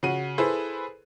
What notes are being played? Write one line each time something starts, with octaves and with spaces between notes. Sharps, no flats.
C#3 F#4 D#7
E4 G#4 A4 B4 C5